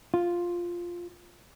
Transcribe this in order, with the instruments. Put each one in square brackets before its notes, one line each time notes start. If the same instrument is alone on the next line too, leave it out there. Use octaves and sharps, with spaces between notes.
[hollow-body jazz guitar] F4